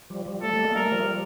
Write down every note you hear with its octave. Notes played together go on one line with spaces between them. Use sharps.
F3 G3
F3 G3
G3 A3 A4
G3 A3
G#3 A#3
G3 A3 A#4
F3 G3